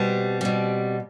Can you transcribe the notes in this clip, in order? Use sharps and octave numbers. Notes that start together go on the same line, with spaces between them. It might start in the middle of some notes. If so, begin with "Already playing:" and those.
Already playing: B2 G3 C4
B2 G3